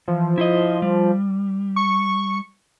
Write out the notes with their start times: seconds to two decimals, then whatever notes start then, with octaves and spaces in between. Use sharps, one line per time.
0.08 E3 F3
0.38 E4 C5 D#5
0.82 G3
1.76 C#6